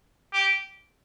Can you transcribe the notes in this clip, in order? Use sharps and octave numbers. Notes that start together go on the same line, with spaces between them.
G4